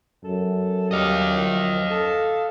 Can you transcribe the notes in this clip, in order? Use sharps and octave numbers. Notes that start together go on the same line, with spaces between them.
F#2 A4
G3 D#5 F5
F3
A4